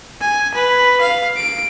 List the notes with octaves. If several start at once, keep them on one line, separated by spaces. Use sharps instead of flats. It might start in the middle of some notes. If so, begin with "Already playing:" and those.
G#5
B4
F5
D7